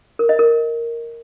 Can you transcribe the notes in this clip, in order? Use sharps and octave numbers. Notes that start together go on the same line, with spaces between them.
A#4
D#5
A#4